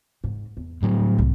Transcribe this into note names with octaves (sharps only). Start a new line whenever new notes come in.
G#2
E2
A2 F#3 G3
C2 G#2